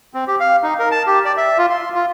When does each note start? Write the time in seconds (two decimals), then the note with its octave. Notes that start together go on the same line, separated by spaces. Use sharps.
0.14 C4
0.28 G4
0.40 F5
0.63 D#4
0.79 A#4
0.92 A5
1.07 G4
1.25 D5
1.37 E5
1.58 F4
1.70 C6
1.94 F4